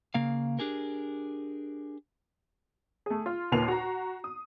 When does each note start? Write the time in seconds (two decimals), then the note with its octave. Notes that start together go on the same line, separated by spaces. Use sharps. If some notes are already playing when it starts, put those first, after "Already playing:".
0.14 C#3 A#3 F5
0.59 D4 G4 G#4 A#4
3.06 A3 G#4
3.26 F4
3.52 D#2 A#2 B4 C7 F7
3.68 F#4 A#5
4.24 D#6